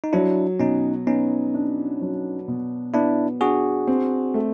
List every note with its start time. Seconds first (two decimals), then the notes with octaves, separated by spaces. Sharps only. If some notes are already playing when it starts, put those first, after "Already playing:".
0.04 D#4
0.13 F#3 D4 E4
0.60 B2 C#4 D#4
1.07 B3 C#4 D#4
1.54 D4
2.01 F#3
2.48 B2
2.94 B3 D4 E4
3.41 D4 F#4 G#4
3.87 C4
4.34 A3